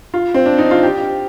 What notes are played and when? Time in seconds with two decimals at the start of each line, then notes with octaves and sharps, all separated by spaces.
0.14 F4
0.34 C4
0.46 D4
0.58 D#4
0.71 F4
0.83 G4